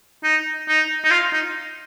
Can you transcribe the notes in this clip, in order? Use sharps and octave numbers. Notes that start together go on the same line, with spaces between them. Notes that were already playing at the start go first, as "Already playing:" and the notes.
D#4
D#4
D#4
F4
D#4